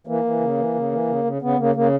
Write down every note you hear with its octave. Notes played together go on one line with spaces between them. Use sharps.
E3 A#3
E3
C#3
E3
C#3
E3
C#3
C#3
C#3 B3
C#3 A#3
C#3 A#3